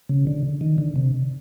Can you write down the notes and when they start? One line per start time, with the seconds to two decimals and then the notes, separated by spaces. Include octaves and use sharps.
0.09 C#3
0.27 D3
0.61 D#3
0.78 D3
0.96 C3